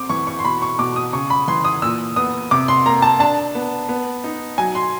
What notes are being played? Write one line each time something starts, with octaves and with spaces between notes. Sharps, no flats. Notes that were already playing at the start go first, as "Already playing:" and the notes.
Already playing: C4 D6
E3 C#6
C#6
C6
B2 B5
C#6
B2 D6
D#6
C#3 C#6
B5
E3 C6
D#6
A#2 E6
B3 D#6
C3 D6
C6
A#3 A#5
A5
D4 A5
B3
B3
D#4
F#3 G#5
C6